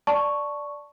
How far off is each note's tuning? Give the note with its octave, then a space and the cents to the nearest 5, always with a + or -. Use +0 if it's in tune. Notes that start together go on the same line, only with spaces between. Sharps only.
D5 +0 A5 +0 C#6 +0